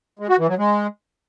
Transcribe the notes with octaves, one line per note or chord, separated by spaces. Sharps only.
G#3
F#4
E3
F#3
G#3